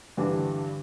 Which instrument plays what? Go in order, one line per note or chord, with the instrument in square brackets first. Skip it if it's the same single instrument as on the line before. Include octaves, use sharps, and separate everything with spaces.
[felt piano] G2 D3 E3 G3 D4